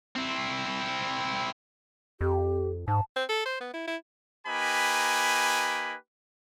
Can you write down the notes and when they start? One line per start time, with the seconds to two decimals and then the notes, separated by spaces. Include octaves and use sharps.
0.15 C4 E4
2.21 F2 G4
2.88 G#2 A5
3.16 C4
3.29 A4
3.45 C5
3.61 B3
3.74 E4
3.87 E4
4.46 A#3 D#4 G4 B4 G#5 B5